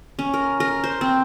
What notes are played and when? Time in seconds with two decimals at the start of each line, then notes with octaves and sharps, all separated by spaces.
0.19 C#4
0.34 A#4
0.60 A#4
0.84 C5
1.01 C4